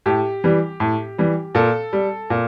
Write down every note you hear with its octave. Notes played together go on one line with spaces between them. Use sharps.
A2 G4
E3 G3
A2
E3 G3
A#2 A4
G3
A#2